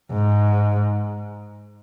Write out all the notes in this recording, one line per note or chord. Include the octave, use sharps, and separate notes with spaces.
G#2